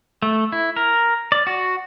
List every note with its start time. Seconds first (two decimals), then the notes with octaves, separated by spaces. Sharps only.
0.22 A3
0.52 E4
0.76 A#4
1.32 D5
1.47 F#4